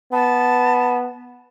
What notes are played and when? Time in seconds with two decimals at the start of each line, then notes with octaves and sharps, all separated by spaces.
0.13 B3 A5